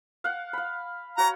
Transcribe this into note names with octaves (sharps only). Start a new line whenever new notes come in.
F5 F#5
F5 B5
F#4 C#5 A#5